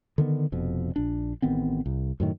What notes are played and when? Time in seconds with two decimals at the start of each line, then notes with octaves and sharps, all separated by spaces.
0.18 D3 D#3 B3
0.52 F1 F2 B2
0.96 A#1 D4
1.42 A1 D#3 B3 C4
1.86 C2
2.20 F#2 A2 D#3